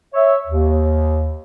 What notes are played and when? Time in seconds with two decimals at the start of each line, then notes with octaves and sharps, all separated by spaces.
0.14 C#5 E5
0.47 D#2